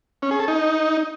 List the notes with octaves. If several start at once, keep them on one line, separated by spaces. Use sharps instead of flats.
C#4
G#4
A4
D#4